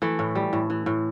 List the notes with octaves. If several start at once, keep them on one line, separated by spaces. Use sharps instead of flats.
E3 A3
A2
G3
A2
E3
A2